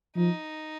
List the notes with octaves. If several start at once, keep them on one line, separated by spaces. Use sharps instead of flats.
F3 D#4